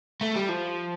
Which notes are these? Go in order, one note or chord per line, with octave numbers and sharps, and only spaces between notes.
A3
G3
F3